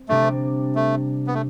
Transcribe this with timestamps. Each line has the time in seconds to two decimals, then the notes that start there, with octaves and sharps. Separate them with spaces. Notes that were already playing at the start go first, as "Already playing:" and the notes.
Already playing: C4
0.09 C3 G3 A3 D4
0.75 A3
1.27 B3
1.35 A3